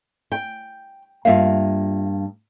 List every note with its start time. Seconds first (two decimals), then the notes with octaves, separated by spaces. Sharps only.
0.32 G5
1.25 G2 A#3 F4 E5 F5